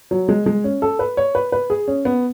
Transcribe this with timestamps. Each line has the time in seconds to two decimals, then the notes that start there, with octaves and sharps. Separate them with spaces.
0.11 F#3
0.29 G#3
0.46 G#3
0.64 C#4
0.82 A4
0.99 B4
1.17 C#5
1.35 B4
1.52 B4
1.70 G#4
1.88 C#4
2.05 B3